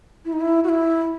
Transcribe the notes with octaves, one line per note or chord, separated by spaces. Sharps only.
E4
D#4
E4
F#4
E4